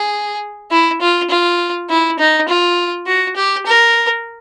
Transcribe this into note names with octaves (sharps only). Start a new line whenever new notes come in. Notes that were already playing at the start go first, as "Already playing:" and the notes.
Already playing: G#4
E4
F4
F4
E4
D#4
F4
F#4
G4
A#4